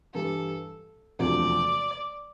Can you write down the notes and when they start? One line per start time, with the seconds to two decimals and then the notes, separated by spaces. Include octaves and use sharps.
0.13 G2 E3 G3 A4
1.19 E1 D2 C3 F3 A3 D5